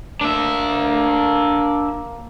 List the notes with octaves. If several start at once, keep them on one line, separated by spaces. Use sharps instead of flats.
A#3 D4 E5